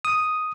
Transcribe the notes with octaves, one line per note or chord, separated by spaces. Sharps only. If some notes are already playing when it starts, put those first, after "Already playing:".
D#6